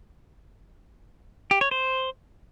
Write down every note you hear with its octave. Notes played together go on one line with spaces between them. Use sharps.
G4
C#5
C5